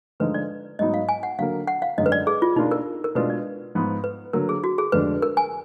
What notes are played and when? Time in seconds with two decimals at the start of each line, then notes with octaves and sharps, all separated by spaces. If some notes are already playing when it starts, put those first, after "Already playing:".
0.20 D3 F3 G#3 D#4 B4
0.34 D5
0.79 G#2 F#3 B3 D#4 D#5
0.94 F5
1.09 G#5
1.23 F#5
1.38 D3 F#3 A#3 F5
1.68 F#5
1.82 F5
1.97 F#2 D3 G#3 D#4 D#5
2.06 B4
2.12 D5
2.27 G#4
2.42 F4
2.56 B2 A#3 D4 D#4 F4
2.71 A#4
3.04 A#4
3.15 B2 G#3 D4 F4 B4
3.30 D5
3.75 G#2 F3 B3 D#4
4.04 B4
4.33 D3 F#3 A#3 A#4
4.49 G#4
4.64 F#4
4.78 G#4
4.92 F2 D3 G#3 D4 B4
5.22 A#4
5.37 G#5